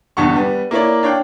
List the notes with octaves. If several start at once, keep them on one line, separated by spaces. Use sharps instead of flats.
G1 E2 G2 F#5 C#6
G3 B3
A#3 E4 C#5 D5
D4 C#5 F5 G5